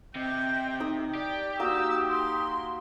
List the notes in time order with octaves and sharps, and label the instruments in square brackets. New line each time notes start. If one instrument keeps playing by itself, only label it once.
[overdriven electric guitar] C3 [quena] D#5 [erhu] G5
[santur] D#4 D#6
[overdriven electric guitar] G4 [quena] D5 [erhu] G5
[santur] A#3 F#4 [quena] D#6 [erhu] E6
[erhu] C6